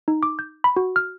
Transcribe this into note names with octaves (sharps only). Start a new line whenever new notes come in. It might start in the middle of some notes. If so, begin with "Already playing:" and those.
D#4
D6
G6
B5
F#4
F6